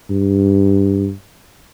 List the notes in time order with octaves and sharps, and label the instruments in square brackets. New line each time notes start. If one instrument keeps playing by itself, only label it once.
[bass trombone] G2